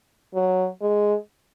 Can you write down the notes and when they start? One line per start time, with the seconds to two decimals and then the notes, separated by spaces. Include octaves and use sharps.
0.34 F#3
0.81 G#3